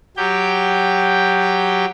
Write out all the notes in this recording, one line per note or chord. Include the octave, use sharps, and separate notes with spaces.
F#3 G4 G5